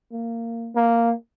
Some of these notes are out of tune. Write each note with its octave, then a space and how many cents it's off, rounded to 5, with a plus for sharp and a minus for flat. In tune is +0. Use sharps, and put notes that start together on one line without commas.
A#3 -15
A#3 -5